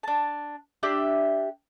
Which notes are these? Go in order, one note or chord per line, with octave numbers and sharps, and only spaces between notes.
D4 A5
D4 G4 E5